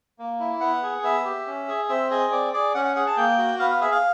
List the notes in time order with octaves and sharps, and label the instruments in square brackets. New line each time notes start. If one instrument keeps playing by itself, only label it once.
[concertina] A#3
E4
B3 F#5
G#4
B3 E5
G4
C#4
G#4
C4 E5
G#4 D#5
C4 D5
G#4 D5
C#4 F#5
F#5
G#4 F#5
A5
A#3 G5
F#4
B3 F5
F5
G#4 E5
F5